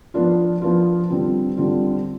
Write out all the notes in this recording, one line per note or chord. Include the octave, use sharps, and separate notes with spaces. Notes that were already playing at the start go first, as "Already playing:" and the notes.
F3 B3 D4 F4
F3 B3 D4 F4
D3 G3 C4 F4
D3 G3 C4 F4